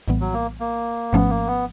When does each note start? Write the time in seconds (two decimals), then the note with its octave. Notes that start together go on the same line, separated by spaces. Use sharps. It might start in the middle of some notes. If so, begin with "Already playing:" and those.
0.08 A#1 A2 E3 G3 B3
0.21 F#3
0.33 A#3
0.60 A#3
1.12 G#1 G#2 F3 A3 B3 C#4
1.30 A#3
1.47 B3